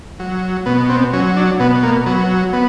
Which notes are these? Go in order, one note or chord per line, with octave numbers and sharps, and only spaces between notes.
F#3
B2 B3
C4
F#3 C#4
D4
B2 B3
A#3
F#3 B3
B3